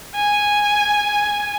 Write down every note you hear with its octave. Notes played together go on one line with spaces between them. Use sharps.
G#5